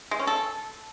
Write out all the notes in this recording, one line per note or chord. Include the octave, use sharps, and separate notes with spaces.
G#3
C#4
A4